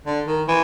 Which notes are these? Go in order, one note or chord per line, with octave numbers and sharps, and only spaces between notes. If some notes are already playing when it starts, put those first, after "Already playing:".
D3
D#3
E3